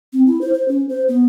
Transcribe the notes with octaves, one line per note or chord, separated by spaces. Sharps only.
C4
E4
C5
C5
C#4
C5
B3